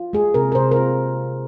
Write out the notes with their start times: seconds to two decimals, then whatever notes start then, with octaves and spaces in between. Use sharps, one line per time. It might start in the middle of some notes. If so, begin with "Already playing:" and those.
Already playing: F4
0.13 G#3 G#4
0.34 C3 A#4
0.52 A#4
0.55 C3 C5
0.72 A#4
0.76 F4